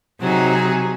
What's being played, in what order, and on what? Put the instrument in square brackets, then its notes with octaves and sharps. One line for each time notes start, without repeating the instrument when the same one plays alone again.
[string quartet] C3 F#3 D#4 G#4